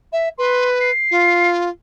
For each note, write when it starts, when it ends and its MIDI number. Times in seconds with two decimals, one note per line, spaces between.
0.13 0.29 76
0.38 0.91 71
0.38 0.68 84
0.81 1.49 96
1.11 1.69 65